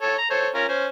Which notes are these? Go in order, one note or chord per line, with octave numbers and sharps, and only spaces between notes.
A4 C#5
A#5
A4 C5 C#5
C#4 F4 A#4
C#4 C5